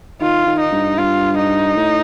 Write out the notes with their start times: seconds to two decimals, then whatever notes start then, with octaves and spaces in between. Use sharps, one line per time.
0.21 D#3 F4
0.46 D#3
0.60 D#4
0.72 G2
0.98 G2 F4
1.38 D#4
1.77 A2